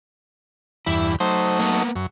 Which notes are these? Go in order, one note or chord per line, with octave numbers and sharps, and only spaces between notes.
E2 G2 E4
F#3 A3 D#4 C5
A#3 B3
F#2